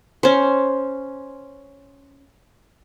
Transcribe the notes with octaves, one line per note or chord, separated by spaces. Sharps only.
C#4 C5